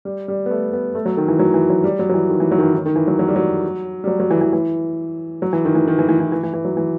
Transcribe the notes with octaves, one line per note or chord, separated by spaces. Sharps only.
G3
G3
B3
A3
B3
A3
F#3
D#3
E3
F#3
E3
F#3
G3
F#3
F#3
E3
D#3
E3
F#3
D#3
E3
D#3
D#3
E3
F#3
F#3
G3
F#3
G3
F#3
F#3
E3
E3
E3
F#3
E3
D#3
E3
D#3
E3
E3
E3
E3
E3
E3
F#3
E3